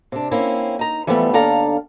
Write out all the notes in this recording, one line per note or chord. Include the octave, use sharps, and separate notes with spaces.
C3 D4
A#3 C4 C#4 E4
D#4 A#5
E3 F3 G3 A3 B3
D#2 D4 A4 F5 A#5